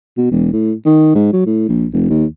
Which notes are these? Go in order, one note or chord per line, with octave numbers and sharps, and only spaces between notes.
B2
E1
A2
D#3
G#2
F#3
A2
A#1
F1
D#2